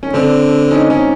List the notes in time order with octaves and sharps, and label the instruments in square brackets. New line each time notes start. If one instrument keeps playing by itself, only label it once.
[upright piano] C#4
[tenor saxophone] D3 [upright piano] C4 D4
[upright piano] C#4 D#4
C#4 D#4